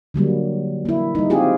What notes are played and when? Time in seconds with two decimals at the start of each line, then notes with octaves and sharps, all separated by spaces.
0.14 D3 F#3 G3 A#3
0.85 A#3 E4
1.15 G3 D#4
1.30 C4 E4 F4 G4 G#4